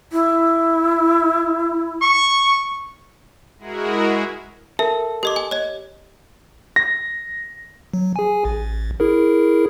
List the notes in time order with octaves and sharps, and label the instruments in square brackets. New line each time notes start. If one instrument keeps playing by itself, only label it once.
[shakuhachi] E4
[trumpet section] C#6
[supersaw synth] G#3 E4 F#4 G#4 A#4
[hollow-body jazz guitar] A4 [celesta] A#4 [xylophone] E5
[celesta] G4 [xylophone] A#4 D#5 D6
[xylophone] G#5
C#5 D#5
[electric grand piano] A#6
[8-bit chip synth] F#3
G#4 G#5
A1
E4 G#4 A#4